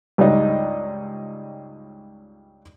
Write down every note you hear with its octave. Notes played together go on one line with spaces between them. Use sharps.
C#2 G2 G3 D4 D#4